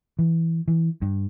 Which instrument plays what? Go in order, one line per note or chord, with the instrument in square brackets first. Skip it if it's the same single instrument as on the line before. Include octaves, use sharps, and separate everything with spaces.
[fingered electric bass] E3
E3
G2